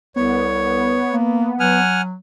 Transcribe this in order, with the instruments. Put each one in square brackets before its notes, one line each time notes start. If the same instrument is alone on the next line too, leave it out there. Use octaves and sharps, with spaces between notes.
[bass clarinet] C2 [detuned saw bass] B3 [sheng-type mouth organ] C#5
[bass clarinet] A#3
[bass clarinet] F#3 [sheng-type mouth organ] F#5 G#5 F6